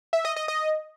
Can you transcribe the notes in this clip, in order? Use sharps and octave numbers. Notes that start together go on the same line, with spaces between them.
E5
D#5
D#5
D#5